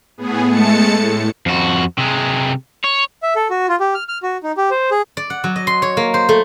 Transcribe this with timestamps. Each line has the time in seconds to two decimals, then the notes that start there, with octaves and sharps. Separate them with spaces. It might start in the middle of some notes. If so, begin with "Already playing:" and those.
0.17 A2 B3 G#4
0.48 G#3 A3 A5 C#7
0.91 A2
1.46 F2 F#4
1.99 C3 G#3
2.84 C#5
3.23 E5
3.36 A4
3.50 F#4
3.69 F4
3.80 G4
3.95 F6
4.09 F6
4.23 F#4
4.43 D#4
4.57 G4
4.71 C5
4.91 G#4
5.17 D5
5.30 F#5
5.44 F#3
5.56 D#5
5.67 C6
5.82 C#5
5.97 A#3
6.14 C5
6.29 A3